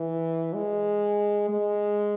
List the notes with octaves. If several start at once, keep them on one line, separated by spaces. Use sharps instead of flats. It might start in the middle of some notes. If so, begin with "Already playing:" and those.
Already playing: E3
G#3
G#3